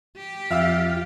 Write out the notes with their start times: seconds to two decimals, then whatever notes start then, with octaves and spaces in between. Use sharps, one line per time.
0.17 G4
0.51 F2 F4 E5 F5 E6